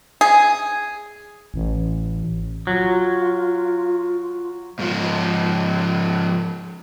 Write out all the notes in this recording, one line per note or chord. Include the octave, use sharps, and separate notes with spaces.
G#4
A1
F#3 F4
G#2 F3